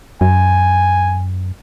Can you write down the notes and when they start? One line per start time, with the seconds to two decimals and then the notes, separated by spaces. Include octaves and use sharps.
0.21 F#2 G#5